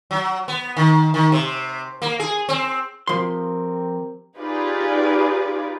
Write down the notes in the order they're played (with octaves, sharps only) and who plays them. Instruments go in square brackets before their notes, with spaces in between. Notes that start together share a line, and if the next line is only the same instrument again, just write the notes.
[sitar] F#3
B3
D#3
D#3
C3
A#3
G#4
C4
[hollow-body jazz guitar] F3 C6 [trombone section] C4 G4 A#4
[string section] D#4 F4 G4 G#4 B4 D5